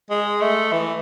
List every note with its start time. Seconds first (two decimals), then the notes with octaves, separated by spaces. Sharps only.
0.10 G#3
0.42 A3
0.72 E3